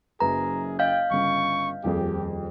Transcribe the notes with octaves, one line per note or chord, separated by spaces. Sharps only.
F#1 F#2 G#4 B4 A#5
D#5 F5 G5 G6
G1 C#3 C#6
D#1 F2 G4 G#4